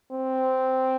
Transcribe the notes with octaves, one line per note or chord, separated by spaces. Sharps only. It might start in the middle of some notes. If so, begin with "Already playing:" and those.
C4